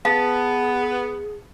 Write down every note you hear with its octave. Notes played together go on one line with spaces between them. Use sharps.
B3 G#4 F5 A5